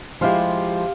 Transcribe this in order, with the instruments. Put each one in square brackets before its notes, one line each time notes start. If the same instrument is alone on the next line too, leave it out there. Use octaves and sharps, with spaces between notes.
[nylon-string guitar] F3 G#3 E4 [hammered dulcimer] G4 F5 C6